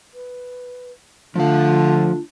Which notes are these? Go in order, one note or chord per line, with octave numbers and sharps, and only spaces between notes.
B4
D3 F3 A3 D4 F4 F5